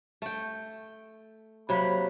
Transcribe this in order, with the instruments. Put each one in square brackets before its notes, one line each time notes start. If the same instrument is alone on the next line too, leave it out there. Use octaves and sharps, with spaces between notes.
[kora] A3 G5
[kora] C3 F#3 A#3 [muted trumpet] B5